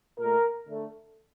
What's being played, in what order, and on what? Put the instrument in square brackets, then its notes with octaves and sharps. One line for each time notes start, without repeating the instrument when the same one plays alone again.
[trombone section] A#2 A3 A#4
D3 A3